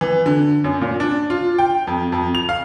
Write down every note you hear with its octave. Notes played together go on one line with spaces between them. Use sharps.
E3
D3
F#2
A#2
D4
F4
G5
F2
F2
F7
F5